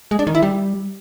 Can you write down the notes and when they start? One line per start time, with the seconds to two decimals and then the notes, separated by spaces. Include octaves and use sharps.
0.11 G#3
0.19 D4
0.27 D#3
0.35 E4
0.42 G3